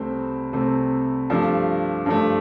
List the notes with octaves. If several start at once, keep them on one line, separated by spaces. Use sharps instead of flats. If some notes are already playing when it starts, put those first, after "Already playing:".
Already playing: C2 C3 A3 C4
C2 C3 A3 C4
G2 F3 A3
G2 F3 A3